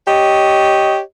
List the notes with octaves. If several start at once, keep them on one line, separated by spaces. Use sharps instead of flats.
G4 C#5 D#5